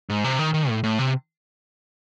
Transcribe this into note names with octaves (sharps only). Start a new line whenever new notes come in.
G#2
C3
D#3
D#3
A2
A2
C3